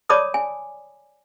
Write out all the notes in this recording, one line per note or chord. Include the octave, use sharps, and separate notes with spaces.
C#5 D5 A5 B5 D6 D#6
G#5